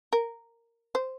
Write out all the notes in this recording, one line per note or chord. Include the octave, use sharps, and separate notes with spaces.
A#4
C5